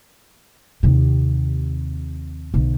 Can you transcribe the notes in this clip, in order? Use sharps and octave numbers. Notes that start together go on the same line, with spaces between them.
D#2 C3
B1 D3